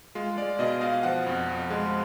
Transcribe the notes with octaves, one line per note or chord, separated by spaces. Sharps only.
G#3 F4
G#3 D5
B2 D#5
B2 F5
F3 F#5
F2
F2
G#3